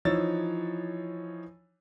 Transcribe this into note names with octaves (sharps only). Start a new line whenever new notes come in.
E3 F3 D#4 C#5 E6 A6